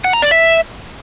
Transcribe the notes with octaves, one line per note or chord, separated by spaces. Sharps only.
F#5
A#5
D5
E5